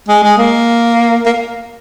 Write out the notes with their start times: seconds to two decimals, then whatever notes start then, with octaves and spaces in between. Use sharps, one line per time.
0.08 G#3
0.23 G#3
0.37 A#3
1.26 A#3